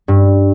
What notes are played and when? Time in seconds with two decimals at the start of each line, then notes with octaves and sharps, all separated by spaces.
0.08 G2